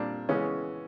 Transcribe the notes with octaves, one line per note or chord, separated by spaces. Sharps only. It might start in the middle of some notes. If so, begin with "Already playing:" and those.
Already playing: A#2 G3 C4 D4
C#3 E3 G#3 B3 C#4